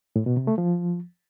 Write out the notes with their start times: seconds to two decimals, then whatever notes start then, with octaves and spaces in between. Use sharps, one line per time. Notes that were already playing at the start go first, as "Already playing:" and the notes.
0.16 A2
0.26 B2
0.37 C3
0.47 A3
0.58 F3